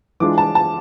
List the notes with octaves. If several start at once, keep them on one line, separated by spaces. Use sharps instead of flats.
E3 G#3 D4 F4 D6
A5
A5